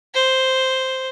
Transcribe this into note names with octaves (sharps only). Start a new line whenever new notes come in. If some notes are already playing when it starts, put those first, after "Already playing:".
C5